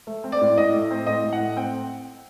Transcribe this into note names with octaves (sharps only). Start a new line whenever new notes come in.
A3
C4
D5
A2
A2 D#5
A3
C4
A2 D#5
A2
F#5
A3
C4 G5